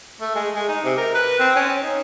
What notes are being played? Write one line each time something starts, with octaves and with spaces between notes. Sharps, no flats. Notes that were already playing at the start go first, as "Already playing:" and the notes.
A3
G#3
G#3
D#4
C3
A#4
B4
C4
C#4
D#4